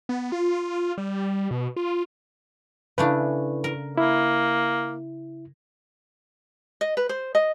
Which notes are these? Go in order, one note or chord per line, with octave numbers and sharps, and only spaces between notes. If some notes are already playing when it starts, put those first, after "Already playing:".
B3
F4
G3
B2
F4
C#3 A3 D4 E4 B4
A#4
A#3 E4
D#5
B4
C5
D#5